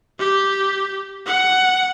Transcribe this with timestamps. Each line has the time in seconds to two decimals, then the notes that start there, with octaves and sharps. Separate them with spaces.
0.19 G4
1.26 F#5